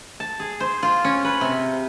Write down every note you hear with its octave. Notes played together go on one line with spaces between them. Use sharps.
A5
G#4
C5
F4
C#4
B4
C3